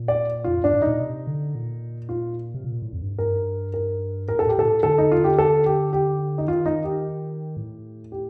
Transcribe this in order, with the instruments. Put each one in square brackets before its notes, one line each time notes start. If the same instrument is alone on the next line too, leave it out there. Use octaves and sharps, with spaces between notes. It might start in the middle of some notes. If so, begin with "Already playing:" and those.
Already playing: [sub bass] A#2
[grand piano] D5
[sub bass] F2 [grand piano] F4
[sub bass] G2 [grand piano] D4
[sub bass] A2
[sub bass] A#2 [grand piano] D#4
[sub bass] C3
D3
A#2
[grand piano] F4
[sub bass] C3
A#2
A2
F2
G2
[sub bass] G2 [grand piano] A#4
[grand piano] A#4
[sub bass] A2 [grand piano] A#4
[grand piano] A4
[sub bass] A2 [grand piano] G4
[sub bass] A#2 [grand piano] A4
[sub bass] A2
[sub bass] D3 [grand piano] A4
[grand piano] D#4
F4
G4
A4
G4
G4
D#4
[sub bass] D#3 [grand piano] F4
[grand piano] D#4
G4
[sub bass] A2
[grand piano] G4